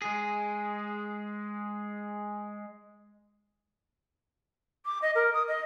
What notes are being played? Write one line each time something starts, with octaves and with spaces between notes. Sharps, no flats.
G#3 G#4
D6
D#5
A#4
D#6
D#5